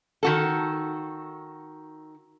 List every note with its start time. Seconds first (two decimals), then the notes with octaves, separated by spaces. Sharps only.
0.23 D#3 F#4 A4